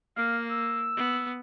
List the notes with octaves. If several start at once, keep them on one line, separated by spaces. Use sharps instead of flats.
A#3 F5
E6
B3